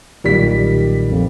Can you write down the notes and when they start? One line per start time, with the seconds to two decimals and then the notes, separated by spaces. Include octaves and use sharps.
0.24 B1 A#2 D#3 G3 B6
1.12 F2